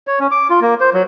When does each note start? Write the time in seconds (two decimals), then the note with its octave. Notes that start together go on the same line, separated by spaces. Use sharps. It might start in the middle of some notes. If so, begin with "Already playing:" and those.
0.07 C#5
0.20 C#4
0.31 D6
0.50 F4
0.61 A#3
0.81 C5
0.94 F#3